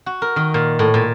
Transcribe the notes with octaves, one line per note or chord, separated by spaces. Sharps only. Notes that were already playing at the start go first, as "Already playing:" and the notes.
F#4
A#4
D#3
A#2
A2
A#2